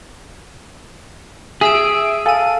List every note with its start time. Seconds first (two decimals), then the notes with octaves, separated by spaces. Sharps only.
1.61 G#4 E5 E6 D7
2.26 A4 F5 G#5 D#7